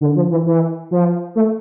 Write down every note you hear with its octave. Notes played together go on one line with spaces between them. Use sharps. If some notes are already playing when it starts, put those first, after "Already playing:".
D3
F3
E3
E3
F3
A3